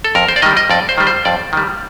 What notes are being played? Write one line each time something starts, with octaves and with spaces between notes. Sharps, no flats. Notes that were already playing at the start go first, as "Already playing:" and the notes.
A4
F2 A#4
C5
D5
D#3 G3 D#5
D#5
F2 D5
C5
D#3 G3
C5
F2 D5
D#3 G3